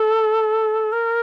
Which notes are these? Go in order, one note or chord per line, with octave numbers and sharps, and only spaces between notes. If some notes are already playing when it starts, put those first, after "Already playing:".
Already playing: A4
A#4